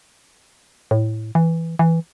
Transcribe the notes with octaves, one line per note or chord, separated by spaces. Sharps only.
A2
E3
E3